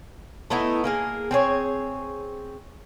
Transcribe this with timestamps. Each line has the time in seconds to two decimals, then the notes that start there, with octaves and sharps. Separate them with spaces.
0.50 A3 B3 D#4 E4
0.84 A#3 G#4 A#4
1.31 C4 G#4 C#5